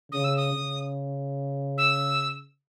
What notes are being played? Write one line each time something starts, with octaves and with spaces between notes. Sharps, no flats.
C#3 D#6
E6
D#6
C#3
E6